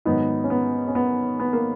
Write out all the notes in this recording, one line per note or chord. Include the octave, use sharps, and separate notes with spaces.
G#2 D#3 F#3 B3 D#4
C#4
B3
C#4
B3
B3
A#3